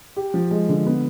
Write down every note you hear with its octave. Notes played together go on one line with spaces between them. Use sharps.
G4
F3
G#3
D3
B3